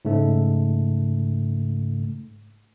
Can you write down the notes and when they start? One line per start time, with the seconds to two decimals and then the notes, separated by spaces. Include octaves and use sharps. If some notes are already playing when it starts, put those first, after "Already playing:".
0.05 G#2 C#3 A3